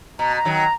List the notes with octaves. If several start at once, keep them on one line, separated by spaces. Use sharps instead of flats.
B2 A#5
A#5
D#3 F#3
A#5